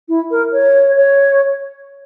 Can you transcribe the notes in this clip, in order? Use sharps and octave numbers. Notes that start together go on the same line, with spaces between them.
E4
A#4
C#5
C#5